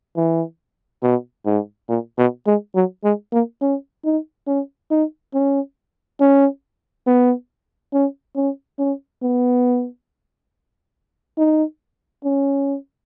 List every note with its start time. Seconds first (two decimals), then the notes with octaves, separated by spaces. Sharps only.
0.16 E3
1.03 B2
1.46 G#2
1.89 A#2
2.18 B2
2.47 G#3
2.75 F#3
3.04 G#3
3.33 A#3
3.62 C#4
4.05 D#4
4.47 C#4
4.91 D#4
5.34 C#4
6.20 C#4
7.07 B3
7.93 C#4
8.36 C#4
8.79 C#4
9.22 B3
11.38 D#4
12.25 C#4